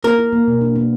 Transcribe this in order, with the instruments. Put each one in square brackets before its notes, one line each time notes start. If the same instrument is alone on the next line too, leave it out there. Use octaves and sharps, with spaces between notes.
[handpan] A#3 [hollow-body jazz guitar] A#4
[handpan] E4
A#3
B2
D4
B3